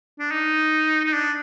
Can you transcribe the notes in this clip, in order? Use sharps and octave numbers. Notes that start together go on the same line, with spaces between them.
D4
D#4
D#4
D4